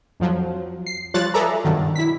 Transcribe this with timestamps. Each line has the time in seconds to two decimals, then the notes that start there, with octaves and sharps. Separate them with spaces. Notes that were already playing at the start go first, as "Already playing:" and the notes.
0.20 F2 F3 F#3
0.86 C7
1.14 F3 G3 F4 C#5 F#6 A6
1.34 G#4 A4 B4 D5 E5 A#5
1.64 G2 B2 D#3 F#3
1.96 E4 B6